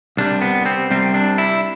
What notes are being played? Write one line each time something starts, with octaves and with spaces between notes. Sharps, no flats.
C2 C3 G3 D4
B3
C4
C2 C3 G3 C4
D4
E4